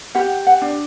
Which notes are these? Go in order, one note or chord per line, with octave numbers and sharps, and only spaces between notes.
G4 F#5
F#5
D4